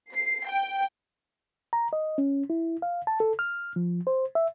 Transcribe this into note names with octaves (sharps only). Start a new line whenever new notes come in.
C7
G5
A#5
D#5
C#4
E4
F5
A5
A4
F6
F3
C5
E5